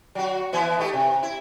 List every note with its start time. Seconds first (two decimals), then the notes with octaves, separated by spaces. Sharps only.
0.15 F#3 F#4
0.53 E3 B3 E4
0.79 A3 D#4 G4
0.93 C3
1.23 E4